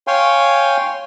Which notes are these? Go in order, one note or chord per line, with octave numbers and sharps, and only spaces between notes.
C#5 F5 G5 G#5 C6